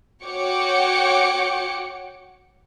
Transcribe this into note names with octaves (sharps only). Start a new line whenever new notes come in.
F#4 C#5 F#5 G5 D6 C#7